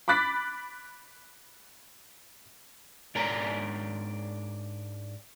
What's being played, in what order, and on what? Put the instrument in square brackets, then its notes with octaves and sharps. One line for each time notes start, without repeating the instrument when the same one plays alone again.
[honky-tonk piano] B5 D6 F#6 A6 B6
[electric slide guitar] G#2 D4 A#4 C#5 D5 A#5